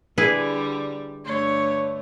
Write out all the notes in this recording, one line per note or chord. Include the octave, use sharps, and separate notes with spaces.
D3 G3 E4 G#4 B4
G2 D3 A3 C#5